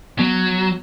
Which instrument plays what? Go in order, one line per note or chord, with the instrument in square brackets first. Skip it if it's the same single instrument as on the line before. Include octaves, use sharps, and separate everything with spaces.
[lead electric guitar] F#3 [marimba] B3